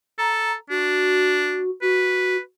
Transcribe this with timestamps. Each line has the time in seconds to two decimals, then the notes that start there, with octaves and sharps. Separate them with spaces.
0.18 A4 A#5
0.70 D4 F#4
1.82 F#4 B4